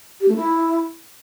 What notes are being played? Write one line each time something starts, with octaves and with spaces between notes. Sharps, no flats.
G4
A3
E4